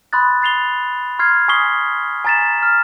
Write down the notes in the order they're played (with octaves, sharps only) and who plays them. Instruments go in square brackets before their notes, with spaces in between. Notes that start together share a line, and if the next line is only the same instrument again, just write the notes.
[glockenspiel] B5 C6 D#6 F#6 A6
A6 C7 F7 G7
C6 F6 G#6 C7
G#5 C#6 D#6 B6 C7 G7
G#5 A#5 A6 B6 E7
F6